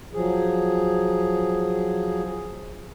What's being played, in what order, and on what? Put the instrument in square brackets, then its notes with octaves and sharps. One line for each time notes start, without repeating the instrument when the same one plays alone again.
[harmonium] F3 F#3 G#4